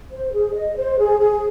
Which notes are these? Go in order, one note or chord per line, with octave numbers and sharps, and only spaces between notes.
C5
G#4
D#5
C5
G#4
G#4